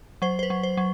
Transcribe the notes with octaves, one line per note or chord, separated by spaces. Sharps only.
F#3 C5
C5
B4
F#3
C5
F#3